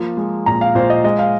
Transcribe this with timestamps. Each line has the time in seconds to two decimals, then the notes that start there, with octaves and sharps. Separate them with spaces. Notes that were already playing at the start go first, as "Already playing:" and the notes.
Already playing: F3 A#3
0.17 G#3
0.46 A#2 A#5
0.61 F5
0.75 A#2 C5
0.90 D#5
1.04 G#3 D#5
1.19 F5